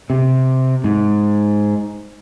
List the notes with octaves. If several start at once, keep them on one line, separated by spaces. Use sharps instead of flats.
C3
G#2